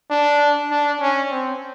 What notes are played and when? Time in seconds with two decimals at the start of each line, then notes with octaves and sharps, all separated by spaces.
0.10 D4
0.71 D4
1.01 C#4
1.31 C4